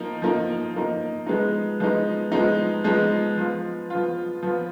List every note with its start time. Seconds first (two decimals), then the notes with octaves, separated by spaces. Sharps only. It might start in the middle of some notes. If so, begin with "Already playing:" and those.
Already playing: F3 A#3 D#4
0.22 F3 A#3 D#4
0.74 F3 A#3 D#4
1.27 F3 G#3 B3 D#4
1.80 F3 G#3 B3 D#4
2.32 F3 G#3 B3 D#4
2.84 F3 G#3 B3 D#4
3.37 F3 B3 F4
3.90 F3 B3 F4
4.43 F3 B3 F4